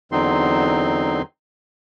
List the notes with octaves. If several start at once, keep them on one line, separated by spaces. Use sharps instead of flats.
E2 D3 F#3 C4 D#4 C6